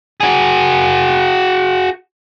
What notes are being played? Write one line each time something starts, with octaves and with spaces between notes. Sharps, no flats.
F#4 G#4